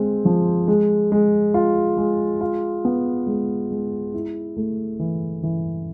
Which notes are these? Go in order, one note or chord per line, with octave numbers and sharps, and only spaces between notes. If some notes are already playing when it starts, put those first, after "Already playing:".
Already playing: G#3 C4
F3
G#3
G#3
F4
G#3
F4
B3
G#3
G#3
E4
A3
E3
E3